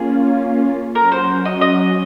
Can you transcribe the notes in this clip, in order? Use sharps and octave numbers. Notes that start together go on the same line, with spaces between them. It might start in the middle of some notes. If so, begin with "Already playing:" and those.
Already playing: A#3 C#4 F4 G#4
F#3 C#4 F#4 A#4
C5
D#5
D#5